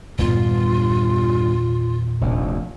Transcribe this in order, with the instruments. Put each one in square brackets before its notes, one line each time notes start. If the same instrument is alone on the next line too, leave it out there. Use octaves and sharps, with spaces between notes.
[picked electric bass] E2 A#2 D#3 [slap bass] G2 B3 [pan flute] F4
[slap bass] F1 A#1 D#2